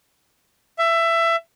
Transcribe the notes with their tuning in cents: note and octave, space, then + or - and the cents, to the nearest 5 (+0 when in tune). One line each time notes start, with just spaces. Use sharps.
E5 +20